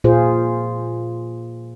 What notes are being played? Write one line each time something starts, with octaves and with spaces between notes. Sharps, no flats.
A#2 F4 G#4 C5